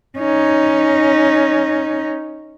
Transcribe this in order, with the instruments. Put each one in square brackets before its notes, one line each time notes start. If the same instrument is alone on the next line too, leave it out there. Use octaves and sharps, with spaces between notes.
[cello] C#4 D#4